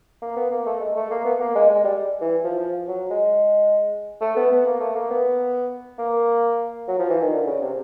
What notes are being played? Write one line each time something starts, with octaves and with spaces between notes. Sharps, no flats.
A#3
B3
A#3
A3
G#3
A3
A#3
B3
A#3
G#3
G#3
G3
E3
F3
F3
F#3
G#3
A3
B3
B3
A#3
A3
A#3
B3
A#3
F#3
F3
E3
D#3
D3
C#3
C3